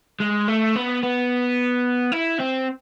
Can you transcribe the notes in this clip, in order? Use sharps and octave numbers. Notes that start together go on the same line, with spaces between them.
G#3
A3
B3
B3
E4
C4